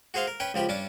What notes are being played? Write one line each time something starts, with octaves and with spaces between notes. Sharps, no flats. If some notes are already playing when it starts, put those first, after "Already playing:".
F#4 G#4 C5 F5 C6
A#4
C#4 B4 G5
C#2 F3 G4 B5
G2 C#4 D4 D6